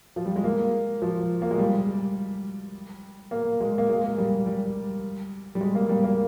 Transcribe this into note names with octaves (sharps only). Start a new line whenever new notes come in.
F3
G3
G#3
A#3
F3
A#3
G#3
G3
A#3
G#3
A#3
G#3
A#3
G3
G3
G3
G#3
A#3
G3
A#3